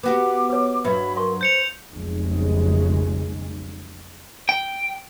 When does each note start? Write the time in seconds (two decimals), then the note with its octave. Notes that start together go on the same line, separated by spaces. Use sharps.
0.03 B3 F#4 G4 D6
0.50 B4 C#5
0.84 G2 F#3 B4 E5 B5
1.16 A#4 F5 C6 C#6
1.41 C5 G6 C#7 F7
1.91 F1 B1 C#3 G#3
4.49 G5